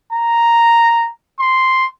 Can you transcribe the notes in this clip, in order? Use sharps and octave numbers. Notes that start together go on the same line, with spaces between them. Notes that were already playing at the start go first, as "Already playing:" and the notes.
A#5
C6